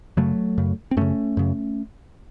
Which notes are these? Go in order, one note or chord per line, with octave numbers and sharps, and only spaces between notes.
F#2 C#3 F#3 A3
F#2 C#3
C4
F#2 C#3 A3 C#4
F#2 C#3